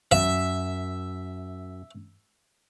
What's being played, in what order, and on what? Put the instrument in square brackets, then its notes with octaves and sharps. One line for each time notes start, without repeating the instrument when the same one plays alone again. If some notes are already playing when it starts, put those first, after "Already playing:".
[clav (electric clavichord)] F#2 [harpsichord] E5